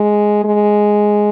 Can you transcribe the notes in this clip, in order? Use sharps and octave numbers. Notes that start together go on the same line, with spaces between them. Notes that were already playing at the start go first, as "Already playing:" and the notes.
Already playing: G#3
G#3